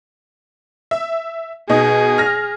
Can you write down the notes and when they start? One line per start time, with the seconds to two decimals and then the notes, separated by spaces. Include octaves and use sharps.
0.91 E5
1.69 B2 D#4 G#4
2.18 F6 A#6